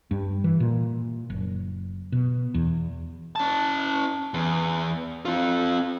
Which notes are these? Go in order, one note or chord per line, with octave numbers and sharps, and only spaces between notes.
G2
E3
A#2
F#1
B2
E2
C#4 A5
E2
C4 F4